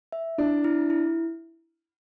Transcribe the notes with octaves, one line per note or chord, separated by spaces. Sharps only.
E5
D4 E4
E4
E4